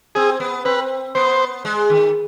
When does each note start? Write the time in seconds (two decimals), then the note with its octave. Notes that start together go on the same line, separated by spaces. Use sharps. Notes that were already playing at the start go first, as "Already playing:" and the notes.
0.15 C4 G#4
0.40 B3
0.65 C4 B4
1.15 B3 C5
1.65 G#3
1.90 D#3